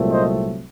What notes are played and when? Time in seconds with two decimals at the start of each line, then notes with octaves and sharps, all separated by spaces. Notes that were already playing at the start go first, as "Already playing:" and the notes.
Already playing: C2 A#2 F#3 A3 C4
0.11 C5 D#5